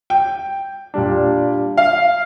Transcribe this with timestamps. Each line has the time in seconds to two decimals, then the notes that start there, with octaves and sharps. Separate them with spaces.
0.10 G5
0.94 A#2 G3 D4
1.77 F5